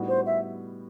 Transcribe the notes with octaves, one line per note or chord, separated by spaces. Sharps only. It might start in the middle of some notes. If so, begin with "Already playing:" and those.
Already playing: A2 G3 B3 D#4 F#4
C5
E5